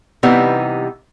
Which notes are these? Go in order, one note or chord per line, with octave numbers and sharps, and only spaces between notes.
C3 E3 G3 B3 D#4